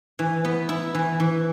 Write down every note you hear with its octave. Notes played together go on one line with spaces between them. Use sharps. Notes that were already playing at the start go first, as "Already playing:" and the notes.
E3
B3
E4
E3
E3